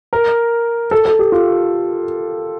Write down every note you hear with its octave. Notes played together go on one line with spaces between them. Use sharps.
A#4
A4
A4
G4
F4